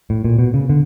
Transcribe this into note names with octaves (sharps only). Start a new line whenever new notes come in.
A2
A#2
B2
C#3
D3